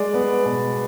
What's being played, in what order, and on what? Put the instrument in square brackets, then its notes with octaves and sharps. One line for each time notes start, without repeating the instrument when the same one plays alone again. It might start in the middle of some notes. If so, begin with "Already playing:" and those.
Already playing: [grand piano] G#3 D5
B3
B2